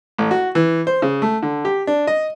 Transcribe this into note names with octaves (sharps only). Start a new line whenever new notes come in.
A1
F#4
E3
C5
C#3
A3
D3
G4
D4
D#5